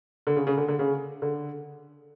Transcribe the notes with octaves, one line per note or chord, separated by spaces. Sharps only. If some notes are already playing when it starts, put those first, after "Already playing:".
D3
C#3
C#3
D3
D3
C#3
D3